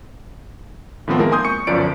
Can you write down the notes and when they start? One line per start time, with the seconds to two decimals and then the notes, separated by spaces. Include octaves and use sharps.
1.08 A2 D#3 F3 B3 C4
1.19 G#3 A#3 A#4
1.32 G#5 C6 D#6 G6
1.45 C#6 C#7
1.67 G1 F#2 F3 D5 D7